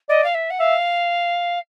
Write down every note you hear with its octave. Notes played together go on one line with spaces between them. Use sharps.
D5 D#5
F5
E5
F#5
E5 F5